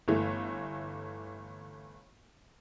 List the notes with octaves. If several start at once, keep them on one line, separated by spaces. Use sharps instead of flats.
G1 E3 A3